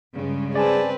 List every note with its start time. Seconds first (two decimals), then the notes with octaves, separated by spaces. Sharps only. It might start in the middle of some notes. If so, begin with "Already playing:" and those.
0.14 G2 C#3 G#3
0.55 C4 G#4 B4 D5 G#5 A5